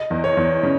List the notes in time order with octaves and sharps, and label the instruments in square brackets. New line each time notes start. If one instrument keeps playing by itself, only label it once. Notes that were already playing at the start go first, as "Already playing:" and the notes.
Already playing: [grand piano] D#5
[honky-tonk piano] E2
[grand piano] C#5
[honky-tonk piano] E2
C#3